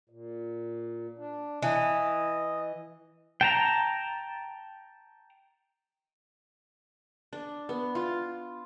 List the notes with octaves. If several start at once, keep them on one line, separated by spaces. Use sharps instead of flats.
A#2
D4
E3 D#5
G5 A5 A#5
D4
B3
F4